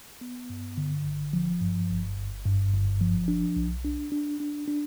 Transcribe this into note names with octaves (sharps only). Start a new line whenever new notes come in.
B3
G2
D3
G1
F3
G2
G1
G1
G2
G1
F3
D4
B1
D4
D4
D4
D4